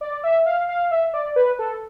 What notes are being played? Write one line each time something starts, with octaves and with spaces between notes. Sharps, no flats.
D5
E5
F5
F5
E5
D5
B4
A4